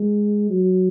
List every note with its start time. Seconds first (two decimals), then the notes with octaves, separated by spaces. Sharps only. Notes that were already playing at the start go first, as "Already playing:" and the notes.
Already playing: G#3
0.50 F#3